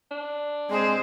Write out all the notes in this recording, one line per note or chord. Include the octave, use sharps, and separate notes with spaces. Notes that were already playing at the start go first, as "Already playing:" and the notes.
D4
G#3 C4 G#4 C5